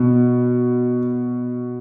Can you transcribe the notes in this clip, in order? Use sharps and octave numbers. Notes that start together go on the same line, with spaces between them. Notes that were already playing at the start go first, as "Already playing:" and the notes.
Already playing: B2